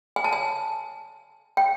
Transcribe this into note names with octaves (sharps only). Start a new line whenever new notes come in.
G#5
A5
G#5
G5